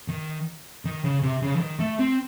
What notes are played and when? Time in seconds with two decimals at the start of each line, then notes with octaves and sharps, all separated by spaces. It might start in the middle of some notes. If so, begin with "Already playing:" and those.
0.08 D#3
0.85 D#3
1.04 C#3
1.22 C3
1.42 C#3
1.56 E3
1.60 D#3
1.79 A3
1.99 C4